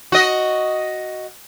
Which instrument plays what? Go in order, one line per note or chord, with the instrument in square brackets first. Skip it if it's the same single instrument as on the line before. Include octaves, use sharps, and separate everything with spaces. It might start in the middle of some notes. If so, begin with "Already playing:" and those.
[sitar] F#4 D#5